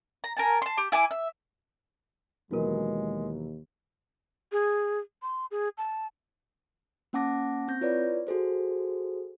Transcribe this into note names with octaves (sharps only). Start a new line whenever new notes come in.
A#5
A#4 G#5 A5
A5 C6
G4
E4 G#5 B5 D6
E5
D#2 B2 E3 F#3 G#3 F#4 A#4
G#4
C6
G#4
A5
A#3 C#4 F#5 A5 D6 A#6
C4 G6 A#6
E4 F4 B4 C#5 D5
F#4 G#4 A4 C5